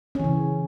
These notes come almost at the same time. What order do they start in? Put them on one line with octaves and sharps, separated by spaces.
C#4 E3 C#3